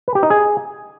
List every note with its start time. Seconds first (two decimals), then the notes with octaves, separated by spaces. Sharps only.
0.08 B4
0.15 G4
0.23 D#4
0.30 G#4